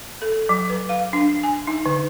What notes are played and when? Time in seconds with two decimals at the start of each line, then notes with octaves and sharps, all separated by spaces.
0.22 A4
0.49 F#3
0.69 B4
0.89 F5
1.13 D4
1.43 G#5
1.67 D#4
1.86 D3